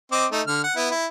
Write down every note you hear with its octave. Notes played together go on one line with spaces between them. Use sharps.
C4 D#5 D6
A3 D#4
D3 F6
F#5
B3 E4
E4